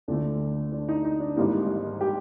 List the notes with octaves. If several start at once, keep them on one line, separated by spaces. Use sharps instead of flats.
D2 D3 F3 A3 D4
D4
D#4
D#4
D4
G#1 G#2 E3 G3 A#3 D#4
G4